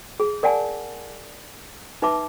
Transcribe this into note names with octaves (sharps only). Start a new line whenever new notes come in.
G#4
A#4 D5 F#5 G#5 A5
D#4 B4 E5 A5 D6